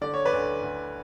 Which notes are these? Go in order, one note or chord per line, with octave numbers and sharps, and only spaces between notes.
D3 D5
C#5
B4 D5
D2
D2